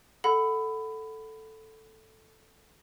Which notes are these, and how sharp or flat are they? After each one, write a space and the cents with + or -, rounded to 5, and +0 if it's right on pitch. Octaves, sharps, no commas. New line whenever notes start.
A4 +0 F#5 +0 B5 +20